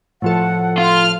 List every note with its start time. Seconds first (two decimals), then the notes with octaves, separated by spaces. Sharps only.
0.22 A2 F3 A4 F#5
0.78 F4 F6